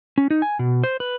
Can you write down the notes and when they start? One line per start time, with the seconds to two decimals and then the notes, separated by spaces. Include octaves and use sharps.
0.18 C#4
0.30 D#4
0.42 G#5
0.59 B2
0.84 C5
1.00 B4